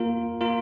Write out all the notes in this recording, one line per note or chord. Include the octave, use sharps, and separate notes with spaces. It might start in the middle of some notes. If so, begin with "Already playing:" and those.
Already playing: A#3 F4 A#4
A#3 F4 A#4